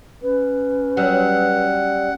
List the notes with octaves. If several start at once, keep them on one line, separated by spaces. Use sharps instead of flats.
C#4 B4
F#3 G3 F#5